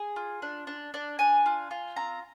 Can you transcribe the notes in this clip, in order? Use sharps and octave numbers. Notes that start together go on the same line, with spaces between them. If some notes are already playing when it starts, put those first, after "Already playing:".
Already playing: G#4
F4
D4
D4
D4
D4 G#5
F4
F4
C4 A#5